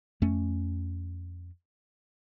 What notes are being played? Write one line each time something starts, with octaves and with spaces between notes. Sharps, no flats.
F2 A3 C#4